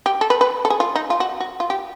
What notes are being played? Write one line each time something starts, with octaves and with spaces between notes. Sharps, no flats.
G4
A4
B4
B4
A4
G#4
F4
D#4
F4
F#4
F#4
F4
G4